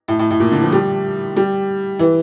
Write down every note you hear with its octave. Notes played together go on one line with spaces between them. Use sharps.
A2
A2
A2
A#2
D3
F3
G3
G3
E3